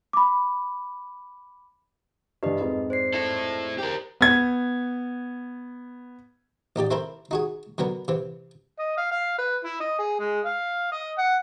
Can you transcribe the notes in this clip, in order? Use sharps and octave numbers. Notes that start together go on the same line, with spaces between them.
B5 D6
G2 E3 B4 D#5
F2 G#2
C5 D5 C7
E4 A4
G4 A#4
B3 G#6
A1 D#4 G4 D5
C4 E4 A4 A#4 C5
D#4 F#4 G#4
D3 F#3 B3 A#4
C3 E3
D#5
F5
F5
B4
E4
D#5
G#4
G#3
F5
D#5
F#5